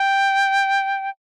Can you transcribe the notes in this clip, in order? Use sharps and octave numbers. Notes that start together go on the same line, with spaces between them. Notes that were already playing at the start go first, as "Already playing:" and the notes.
Already playing: G5